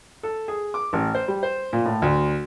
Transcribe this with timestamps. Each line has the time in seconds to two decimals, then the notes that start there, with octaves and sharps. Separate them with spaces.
0.23 A4
0.48 G#4
0.74 D6
0.93 A1
1.15 C5
1.28 G3
1.43 C5
1.73 A#2
1.85 A2
2.02 D2